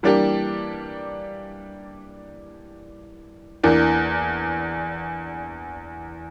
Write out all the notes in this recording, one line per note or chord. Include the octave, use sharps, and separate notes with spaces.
E3 G3 A#3 D4 G4
E2 E3 A#3 D4